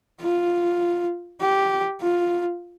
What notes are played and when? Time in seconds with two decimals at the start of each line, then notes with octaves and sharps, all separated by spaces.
0.21 F4
1.41 G4
2.01 F4